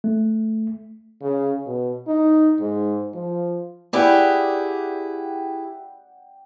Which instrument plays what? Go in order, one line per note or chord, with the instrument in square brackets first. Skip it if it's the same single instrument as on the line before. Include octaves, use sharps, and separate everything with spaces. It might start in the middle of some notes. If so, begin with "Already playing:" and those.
[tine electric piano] A3
[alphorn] C#3
B2
D#4
G#2
F3
[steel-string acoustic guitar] E4 G4 G#4 [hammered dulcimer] D5 F#5 G5